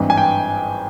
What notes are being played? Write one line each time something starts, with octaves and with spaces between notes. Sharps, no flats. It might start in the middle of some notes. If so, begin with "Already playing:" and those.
Already playing: G#1 G2 E3
G#5
G5